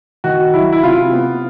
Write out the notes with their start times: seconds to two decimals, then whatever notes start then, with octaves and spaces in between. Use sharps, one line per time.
0.24 D#3 F#4
0.54 F#3 E4
0.73 E4
0.83 C3 F4
1.13 B3